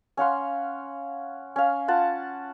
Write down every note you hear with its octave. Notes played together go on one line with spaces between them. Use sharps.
C#4 F5 F#5 C6
C#4 F5
F4 F#5 A5